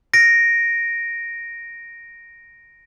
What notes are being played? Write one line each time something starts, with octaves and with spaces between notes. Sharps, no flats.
A#6 D7